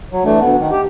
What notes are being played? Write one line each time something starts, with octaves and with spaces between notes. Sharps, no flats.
F#3
E3 A3 D4
D2 B3
D#3
G4